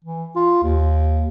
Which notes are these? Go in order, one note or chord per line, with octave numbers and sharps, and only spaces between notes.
E3
F4
D#2